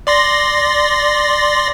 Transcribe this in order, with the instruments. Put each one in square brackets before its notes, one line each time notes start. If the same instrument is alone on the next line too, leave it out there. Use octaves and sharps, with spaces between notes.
[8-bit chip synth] D5 C6 A#6